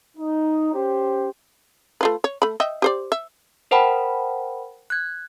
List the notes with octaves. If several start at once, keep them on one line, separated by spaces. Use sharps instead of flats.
D#4
C#4 G4 C5
A3 F4 B4
C#5
A3 B5
D#5 E5 G5
G4 C5 D5
E5
A#4 C5 F#5 G5 A5 B5
F#6 G#6